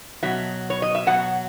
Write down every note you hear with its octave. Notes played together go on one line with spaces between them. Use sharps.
B2 F#3 E5
C#5
D#5
E5
B2 F#3 F#5